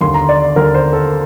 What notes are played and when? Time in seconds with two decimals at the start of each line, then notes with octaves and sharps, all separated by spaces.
0.01 D#2 D3 C6
0.14 A#5
0.29 D5
0.56 D#2 D3 A#4
0.74 C5
0.93 A4